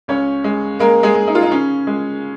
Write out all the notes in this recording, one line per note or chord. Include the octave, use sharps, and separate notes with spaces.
C#2 C#4 C#5
G#3
G#3 A#3 A#4
G#3 G#4
G#3
D#4
F4
D#4
C#3 C#4
G#3